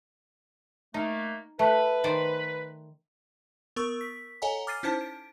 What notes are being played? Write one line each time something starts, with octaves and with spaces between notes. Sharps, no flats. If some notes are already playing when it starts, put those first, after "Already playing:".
A3 A#3 D#4
A3 B4
D#3 C5 D5
B3 A#4 C#6 E6
B6
A4 C#5 D#5 F#5 G#5 A#5
D6 F6 A6 C7 D#7
C#4 D#4 E4 C5 A5
D7